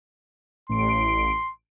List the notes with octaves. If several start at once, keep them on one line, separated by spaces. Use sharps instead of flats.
A1 C6 D7